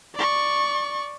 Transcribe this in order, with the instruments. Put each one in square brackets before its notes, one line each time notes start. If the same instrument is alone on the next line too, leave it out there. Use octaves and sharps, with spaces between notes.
[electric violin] D5 C#6